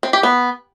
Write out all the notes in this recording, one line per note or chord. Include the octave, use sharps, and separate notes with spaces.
C4
G4
B3